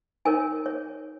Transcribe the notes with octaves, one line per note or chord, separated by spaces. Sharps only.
D#4 A#4 C#5 G#5
C#5